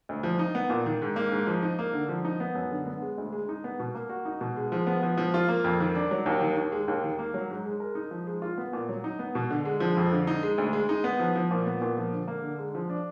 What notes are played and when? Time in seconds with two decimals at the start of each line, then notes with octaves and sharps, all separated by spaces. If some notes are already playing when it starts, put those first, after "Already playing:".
0.09 D2
0.23 F3
0.39 D#4
0.55 B3
0.70 A#2
0.86 D#3
1.02 G#2
1.16 A#3
1.32 G#2
1.47 F3
1.63 D#4
1.79 A#3
1.94 D3
2.09 F3
2.25 D#4
2.40 B3
2.55 F#2
2.71 D3
2.87 B3
3.02 G#3
3.18 D2
3.32 G#3
3.49 D#4
3.64 B3
3.80 B2
3.95 A#3
4.09 F#4
4.25 D#4
4.41 B2
4.56 G#3
4.72 F3
4.87 B3
5.03 F3
5.18 F3
5.34 F4
5.48 A#3
5.64 F2
5.80 D#3
5.95 D4
6.11 F#3
6.26 D#2
6.41 D#3
6.57 D#2
6.72 G#3
6.88 D#2
7.04 D#3
7.19 A#3
7.34 F#3
7.50 G#2
7.65 G#3
7.80 A#4
7.95 D#4
8.11 F3
8.27 G#3
8.42 F4
8.58 B3
8.73 A#2
8.89 F#3
9.04 D#4
9.19 B3
9.35 B2
9.51 D3
9.65 G#3
9.80 F3
9.97 F2
10.12 D3
10.27 D#4
10.43 G#3
10.58 D2
10.73 G#3
10.89 D#4
11.04 B3
11.20 F3
11.36 F3
11.51 A#2
11.67 B3
11.82 A#2
11.97 F3
12.12 D3
12.28 A#3
12.43 D3
12.59 G#3
12.75 F3
12.89 D4